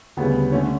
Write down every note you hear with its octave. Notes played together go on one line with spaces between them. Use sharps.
D2 C#3 G3 B3
D3 A3 C#4